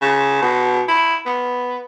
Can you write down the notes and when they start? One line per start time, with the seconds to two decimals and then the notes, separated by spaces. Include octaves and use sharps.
0.02 C#3
0.42 B2
0.88 E4
1.26 B3